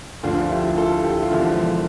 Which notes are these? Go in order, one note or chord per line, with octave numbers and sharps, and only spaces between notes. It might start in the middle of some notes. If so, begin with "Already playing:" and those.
D2 D3 F3 D4 F4
E4 G4
F4 A4
E4 G4
F4
E1 E2 D3 F3 E4